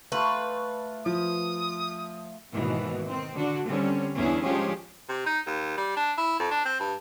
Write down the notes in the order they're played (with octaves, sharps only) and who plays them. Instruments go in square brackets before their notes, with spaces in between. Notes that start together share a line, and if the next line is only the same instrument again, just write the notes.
[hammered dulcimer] A3 F4 [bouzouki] B4
[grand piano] F3 [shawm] D#6
[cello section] D#2 G#2 B2 D#3 E3
D#3 C4
D3 D4 F#4
D3 G3 C4 C#4
E2 C#4 D4 E4 G#4
F3 G#3 C#4 D4 G4 G#4
[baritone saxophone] C3
D#4
D#2
G3
D4
E4
F2
D4
C4
G2